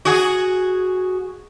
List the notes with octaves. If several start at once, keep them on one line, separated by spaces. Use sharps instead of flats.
F#4 G#4